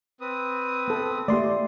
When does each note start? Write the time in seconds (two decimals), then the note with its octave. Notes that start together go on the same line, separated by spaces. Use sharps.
0.21 C4 B4 D#6
0.88 B3 A4
1.28 A3 A#3 G4 D5 C6